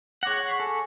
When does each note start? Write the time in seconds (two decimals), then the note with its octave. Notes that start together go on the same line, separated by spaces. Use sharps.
0.23 G#4 C#5 F#5 D6 A#6
0.48 C#6 B6 C7
0.60 A4 G#5